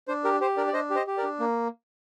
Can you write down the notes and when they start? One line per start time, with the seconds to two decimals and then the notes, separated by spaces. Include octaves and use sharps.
0.08 D4 C5
0.24 G4 A#4
0.40 G4 C5
0.57 D4 A#4 D5
0.68 D5
0.73 D4 C5 D#5
0.90 G4
0.95 C5 D#5
1.07 G4
1.17 A#4 D5
1.23 D4
1.40 A#3